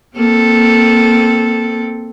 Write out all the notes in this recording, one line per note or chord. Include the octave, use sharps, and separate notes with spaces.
A#3 C4 A4